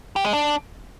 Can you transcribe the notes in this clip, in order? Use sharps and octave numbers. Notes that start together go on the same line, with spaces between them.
G4
G#3
D4